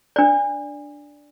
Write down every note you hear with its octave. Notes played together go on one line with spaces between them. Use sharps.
D4 D5